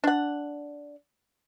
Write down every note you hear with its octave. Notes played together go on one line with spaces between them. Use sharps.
D4 F#5